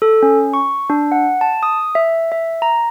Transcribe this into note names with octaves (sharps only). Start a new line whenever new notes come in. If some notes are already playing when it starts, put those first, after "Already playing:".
A4
C#4
C#6
D4
F#5
A5
D#6
E5
E5
A#5